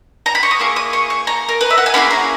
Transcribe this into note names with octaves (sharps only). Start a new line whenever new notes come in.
A#5
B5
C#6
D#6
A#3 E4 G#4 C#6
D#6
C#6
C#6
A#5
A#4
B4
E5
F#5
G#5
A#3 C#4 E4 G#4 B5
A#5